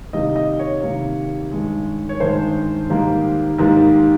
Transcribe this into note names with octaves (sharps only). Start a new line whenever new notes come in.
C3 D#3 G3 A#3 D#5
D#5
C#5
C3 D#3 G3 A#3
G2 D#3 G#3
C#5
G2 D#3 G#3 C5
G#2 D#3 G3 A#3
G#2 D#3 G3 A#3 A#4